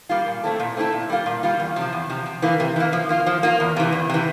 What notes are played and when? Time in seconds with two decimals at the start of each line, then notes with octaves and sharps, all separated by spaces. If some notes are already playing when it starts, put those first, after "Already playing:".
0.09 G3 A#3 F4
0.27 A#2
0.43 A3 C4 E4 A4
0.59 A#2
0.77 A3 C4 E4 A4
0.92 A#2
1.10 G3 A#3 F4
1.26 A#2
1.43 G3 A#3 F4
1.60 E2
1.76 C3 F3
1.92 E2
2.10 C3 F3
2.26 C3
2.42 E3 A#3
2.60 C3
2.76 E3 A#3
2.93 F3
3.09 A#3 F4
3.26 F3
3.43 A#3 F4
3.60 E2
3.76 C3 E3
3.92 E2
4.09 C3 E3